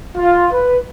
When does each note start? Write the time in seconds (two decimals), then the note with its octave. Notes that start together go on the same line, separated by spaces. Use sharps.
0.16 F4
0.52 B4